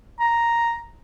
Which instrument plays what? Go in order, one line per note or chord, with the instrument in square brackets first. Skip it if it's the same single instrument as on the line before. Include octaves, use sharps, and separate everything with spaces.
[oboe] A#5